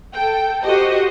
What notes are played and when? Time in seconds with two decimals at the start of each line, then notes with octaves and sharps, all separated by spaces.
0.14 A4 G5
0.64 F#4 G4 C5 D#5